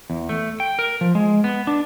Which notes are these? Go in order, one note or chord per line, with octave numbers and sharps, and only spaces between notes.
E2
A3
G5
A#4
F3
G#3
B3
D4